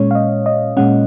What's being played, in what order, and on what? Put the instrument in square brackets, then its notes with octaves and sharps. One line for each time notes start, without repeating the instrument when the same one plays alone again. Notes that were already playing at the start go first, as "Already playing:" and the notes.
Already playing: [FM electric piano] A#2 G#3 C#4 C#5
F5
D#5
D#5
A#2 G#3 C#4 F#5